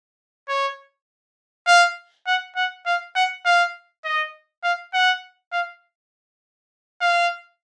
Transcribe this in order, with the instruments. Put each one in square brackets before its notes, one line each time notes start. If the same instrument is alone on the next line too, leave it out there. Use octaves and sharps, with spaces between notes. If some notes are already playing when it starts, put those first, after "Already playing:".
[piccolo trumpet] C#5
F5
F#5
F#5
F5
F#5
F5
D#5
F5
F#5
F5
F5